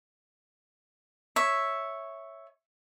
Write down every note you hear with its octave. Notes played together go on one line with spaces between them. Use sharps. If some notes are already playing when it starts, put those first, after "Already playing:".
C#5 E5